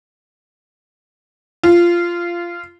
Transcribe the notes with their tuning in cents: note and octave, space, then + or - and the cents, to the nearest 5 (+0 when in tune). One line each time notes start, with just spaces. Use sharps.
F4 -15